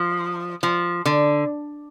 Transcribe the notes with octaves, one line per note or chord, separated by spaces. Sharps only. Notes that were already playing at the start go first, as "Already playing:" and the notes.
Already playing: F3
F3
D3